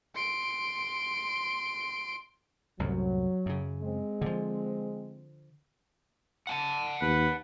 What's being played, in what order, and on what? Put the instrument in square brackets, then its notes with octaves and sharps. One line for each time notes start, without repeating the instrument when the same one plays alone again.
[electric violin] C6 D7
[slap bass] C2 F#2 A2 [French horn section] F#3
[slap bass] F#2 C#3
[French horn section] G#3 C4
[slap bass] D3 F3
[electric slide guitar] F#5 G#5 A5
[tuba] D#2 [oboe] B4